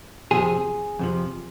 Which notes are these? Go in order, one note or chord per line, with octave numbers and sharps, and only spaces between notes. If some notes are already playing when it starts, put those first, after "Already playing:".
F2 C3 F3 G#4
F2 C3 F3